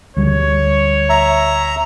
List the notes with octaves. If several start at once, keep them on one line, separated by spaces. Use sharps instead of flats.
D2 G3 C#5
E5 A#5